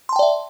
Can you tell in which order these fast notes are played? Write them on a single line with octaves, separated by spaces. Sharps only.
C6 A5 G5 D5 E5